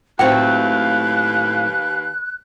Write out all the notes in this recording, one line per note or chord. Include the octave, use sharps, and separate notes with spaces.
D#2 A2 F#3 C4 B4 F5 G5 F#6